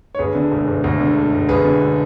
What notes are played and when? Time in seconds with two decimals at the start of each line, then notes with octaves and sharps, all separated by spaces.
0.15 C#5
0.19 D2 G#4 B4
0.35 D3
0.51 E1
0.68 E1
0.84 D2
1.00 D3
1.16 E1
1.33 E1
1.49 D2 G#4 B4
1.65 D3